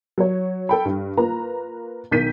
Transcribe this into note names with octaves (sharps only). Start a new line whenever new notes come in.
F#3 C#5
A4 G5 B5
G2
A#3 F4 B4 A#5
B1 D#3 G6 B6 D#7